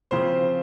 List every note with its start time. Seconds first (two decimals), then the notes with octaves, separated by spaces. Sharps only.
0.11 C#3 F3 C4 C5